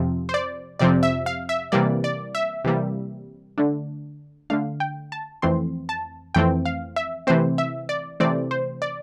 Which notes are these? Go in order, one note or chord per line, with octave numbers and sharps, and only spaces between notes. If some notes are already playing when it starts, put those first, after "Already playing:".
Already playing: F2 C3 F3 C4
C5
D5
F2 C3 F3 C4 D5
E5
F5
E5
C3 E3 G3 A#3 D5
D5
E5
C3 E3 G3 A#3
D3 A3 D4
D3 A3 D4 F5
G5
A5
F2 E3 A3 C4 C6
A5
F2 E3 A3 C4 G5
F5
E5
C3 E3 A3 C4 C5
E5
D5
C3 E3 A3 C4 D5
C5
D5